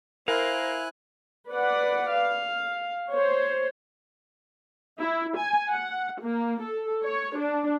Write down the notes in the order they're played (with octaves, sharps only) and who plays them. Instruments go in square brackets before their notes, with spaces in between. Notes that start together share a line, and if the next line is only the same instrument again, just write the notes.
[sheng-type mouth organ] E4 G#5 F#6 [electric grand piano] A#4 [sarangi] C5 [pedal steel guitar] F5
[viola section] B4 D5 F#5
F5
C5 C#5
E4
G#5
F#5
A#3
A4
C#5
D4